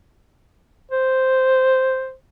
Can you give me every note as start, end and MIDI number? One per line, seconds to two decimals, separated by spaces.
0.91 2.13 72